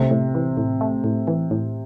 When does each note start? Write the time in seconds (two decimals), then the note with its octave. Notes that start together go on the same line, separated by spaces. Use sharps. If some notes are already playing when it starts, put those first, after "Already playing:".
Already playing: C3 A3
0.11 A2
0.35 E3
0.57 A2
0.81 A3
1.04 A2
1.27 E3
1.51 A2